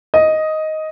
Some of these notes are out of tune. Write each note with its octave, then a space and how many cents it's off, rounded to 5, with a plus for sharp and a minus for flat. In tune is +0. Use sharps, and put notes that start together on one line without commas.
D#5 +5